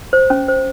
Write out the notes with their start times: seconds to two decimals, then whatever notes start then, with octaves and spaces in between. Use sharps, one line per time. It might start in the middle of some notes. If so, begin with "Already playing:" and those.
0.13 C5
0.30 C#4
0.48 C5